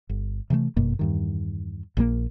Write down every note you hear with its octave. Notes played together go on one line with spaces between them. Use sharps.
G1
C3 E3 F3 A3
G1 F#2 B2 A#3
E2 G2 D#3
A#1 A#2 E3 A#3